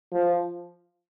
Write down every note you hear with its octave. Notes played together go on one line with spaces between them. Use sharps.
F3